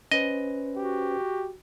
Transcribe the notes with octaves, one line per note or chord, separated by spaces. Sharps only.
C#4 B4 C5 D#5
F#4 G4